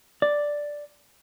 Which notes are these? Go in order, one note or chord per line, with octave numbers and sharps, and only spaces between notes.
D5